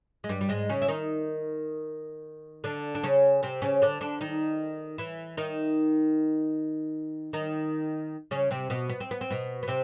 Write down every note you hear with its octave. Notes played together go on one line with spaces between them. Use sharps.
G#3
G2 G3
G3
G#2 G#3
C#3 C#4
E4
D#3 D#4
D3 D4
D4
C#3 C#4
C3 C4
C#3 C#4
D3 D4
D3 D4
D#3 D#4
E3 E4
D#3 D#4
D#3 D#4
C#3 C#4
C3 C4
B2 B3
B3
C4
B3
C4
B2 B3
B3
C3 C4